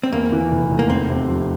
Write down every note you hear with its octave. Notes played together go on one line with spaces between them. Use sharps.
C4
E2 A#3
E3
F1
F1
A#3
E2 C4
C3
F3